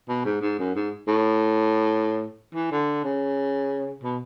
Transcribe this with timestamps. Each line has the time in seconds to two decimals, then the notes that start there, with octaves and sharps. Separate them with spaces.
0.09 B2
0.25 G#2
0.42 G#2
0.59 F#2
0.75 G#2
1.08 A2
2.54 E3
2.71 D3
3.04 C#3
4.03 B2